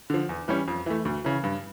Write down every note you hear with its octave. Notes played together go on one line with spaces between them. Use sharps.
D3 F3
E2
E3 G3 C#4
F2
E3 A3
D2
C#3 E3
G2